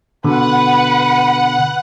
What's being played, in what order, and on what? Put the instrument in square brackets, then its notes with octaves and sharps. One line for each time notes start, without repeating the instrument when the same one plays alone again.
[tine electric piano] B2 D3 [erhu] B4 [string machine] F#5